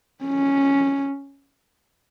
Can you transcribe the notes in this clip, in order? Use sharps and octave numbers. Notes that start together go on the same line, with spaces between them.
C#4